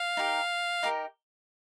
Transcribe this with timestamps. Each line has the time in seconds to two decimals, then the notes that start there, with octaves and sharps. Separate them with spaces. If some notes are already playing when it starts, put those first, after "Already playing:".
Already playing: F5
0.17 D#4 G4 A#4
0.83 D#4 G4 A#4